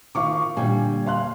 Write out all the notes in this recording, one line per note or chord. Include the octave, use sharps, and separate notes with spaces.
D#3 F4 F5 C#6 D6
A#2 D3 G3 G5 G#5
F5 C6 F#6